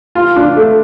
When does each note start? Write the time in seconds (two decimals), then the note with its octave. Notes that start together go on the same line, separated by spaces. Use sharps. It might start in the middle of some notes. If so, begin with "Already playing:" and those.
0.15 F4
0.36 D4
0.57 A3